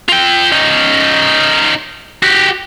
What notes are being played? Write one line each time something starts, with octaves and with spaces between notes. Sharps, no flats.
F4 G5
C#4 D#4
F#4 G4